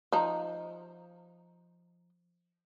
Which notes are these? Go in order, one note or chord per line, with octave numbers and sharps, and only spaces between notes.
F3 D#4